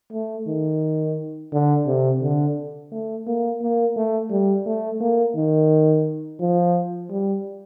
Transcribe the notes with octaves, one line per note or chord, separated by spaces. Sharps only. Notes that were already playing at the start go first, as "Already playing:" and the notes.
A3
D#3
D3
C3
D3
A3
A#3
A#3
A3
G3
A3
A#3
D#3
F3
G3